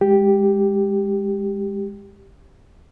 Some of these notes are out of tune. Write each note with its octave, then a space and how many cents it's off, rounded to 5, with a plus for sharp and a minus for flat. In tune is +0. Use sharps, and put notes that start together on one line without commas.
G#3 -20 G4 +0